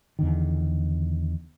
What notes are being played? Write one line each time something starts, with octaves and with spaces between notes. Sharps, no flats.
E2 D3 D#3